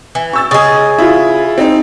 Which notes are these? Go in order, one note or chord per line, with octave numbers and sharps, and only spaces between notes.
E3
C#6 E6 A6
C#3 G#4 D#5 A6
E4 F4
C4 D#4